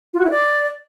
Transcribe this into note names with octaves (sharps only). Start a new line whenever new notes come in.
F4
F#4
E4
D5